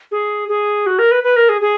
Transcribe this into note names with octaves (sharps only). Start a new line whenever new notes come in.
G#4
G#4
F#4
A#4
B4
B4
A#4
G#4
G#4